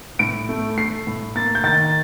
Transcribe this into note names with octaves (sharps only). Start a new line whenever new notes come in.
A2 D7
A3
A3 C7
A2
A#3 A6
G6
D#3 A6